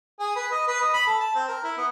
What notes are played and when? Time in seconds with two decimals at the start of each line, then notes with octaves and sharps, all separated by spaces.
0.19 G#4
0.36 B4
0.52 D#5
0.67 B4
0.81 D#5
0.94 B5
1.07 A4
1.20 A5
1.35 C4
1.48 A#4
1.64 E4
1.77 B3